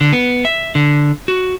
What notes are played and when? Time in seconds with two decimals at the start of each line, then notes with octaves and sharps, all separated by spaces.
0.01 D3
0.13 B3
0.45 E5
0.75 D3
1.28 F#4